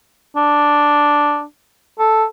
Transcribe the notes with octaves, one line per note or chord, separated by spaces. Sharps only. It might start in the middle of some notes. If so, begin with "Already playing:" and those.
D4
A4